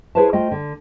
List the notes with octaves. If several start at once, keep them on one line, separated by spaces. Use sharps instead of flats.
E4 G#4 B4 C5 E5 A5
A3 F4 C5 D#5 G5
D3